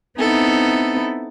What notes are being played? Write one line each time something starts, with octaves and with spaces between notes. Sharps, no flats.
B3 C4 D#4 E4 A4